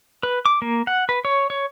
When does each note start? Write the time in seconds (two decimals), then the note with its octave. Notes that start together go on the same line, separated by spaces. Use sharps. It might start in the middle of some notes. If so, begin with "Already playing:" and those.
0.23 B4
0.46 D6
0.62 A#3
0.87 F#5
1.09 B4
1.25 C#5
1.50 C#5